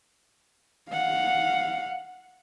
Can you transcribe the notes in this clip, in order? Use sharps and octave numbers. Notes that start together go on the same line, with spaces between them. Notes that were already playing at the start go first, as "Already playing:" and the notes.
F5 F#5